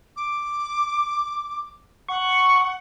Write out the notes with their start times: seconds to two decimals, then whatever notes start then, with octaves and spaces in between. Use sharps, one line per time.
0.16 D6
2.09 F#5 C#6